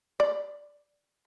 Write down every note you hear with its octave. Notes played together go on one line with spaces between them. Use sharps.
D5